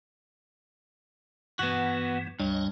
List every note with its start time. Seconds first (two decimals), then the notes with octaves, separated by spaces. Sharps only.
1.59 G2 E3 B3 F#4
2.40 C#2 G2 C#5 D#5